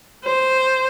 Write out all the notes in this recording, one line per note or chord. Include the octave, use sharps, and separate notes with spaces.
C5